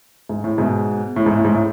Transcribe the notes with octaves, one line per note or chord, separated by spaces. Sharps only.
G#2
A2
G#2 B2
A2
G#2
A2
G#2
A2